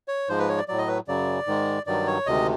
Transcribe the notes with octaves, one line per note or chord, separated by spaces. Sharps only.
C#5
G#2 F3 G#3 C5
B4
C#5
D5
A2 F#3 D5
D#5
B4
F#2 C#3 F#3 D5
G#2 D#3 G#3
G2 D#3 F#3 D5
C#5
D2 C3 D#3 G#3 D#5